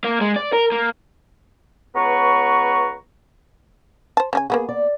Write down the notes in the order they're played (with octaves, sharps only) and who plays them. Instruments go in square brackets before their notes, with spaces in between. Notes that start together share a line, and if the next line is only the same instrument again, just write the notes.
[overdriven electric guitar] A#3
G#3
D5
A#4
A#3
[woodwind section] C#2 B3 B4 C#5 A#5 C#6
[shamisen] C5 A5
C#3 D4 G#5
[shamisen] A#3 B3 F#4 [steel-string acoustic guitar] G#4
[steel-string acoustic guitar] D5